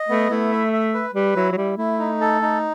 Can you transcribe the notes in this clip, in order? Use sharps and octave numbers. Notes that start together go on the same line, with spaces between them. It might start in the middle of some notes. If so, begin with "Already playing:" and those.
Already playing: D#5
A3 B3
A3 E4
E5
E5
B4
G3 B4
F#3 E4
F#3
G3 E4
A3 E4
D#4
A4
D#4